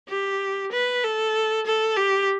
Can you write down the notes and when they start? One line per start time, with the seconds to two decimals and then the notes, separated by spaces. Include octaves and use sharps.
0.09 G4
0.72 B4
1.04 A4
1.66 A4
1.97 G4